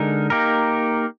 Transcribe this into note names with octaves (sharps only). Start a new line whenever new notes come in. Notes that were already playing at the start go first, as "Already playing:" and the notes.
Already playing: D3 G#3 D#4 A#4
A#3 D#4 G4 A#4